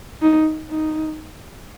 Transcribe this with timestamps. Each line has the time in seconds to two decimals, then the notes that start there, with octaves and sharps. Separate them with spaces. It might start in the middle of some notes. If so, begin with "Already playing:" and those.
0.22 D#4
0.70 D#4